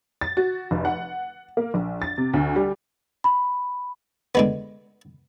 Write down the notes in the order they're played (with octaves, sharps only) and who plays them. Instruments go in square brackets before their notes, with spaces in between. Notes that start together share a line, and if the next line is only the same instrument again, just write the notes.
[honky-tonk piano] A6
F#4
F1
F#5
A#3
A#1
A6
C3
D2
G3
[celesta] B5
[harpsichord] D3 G#3 B3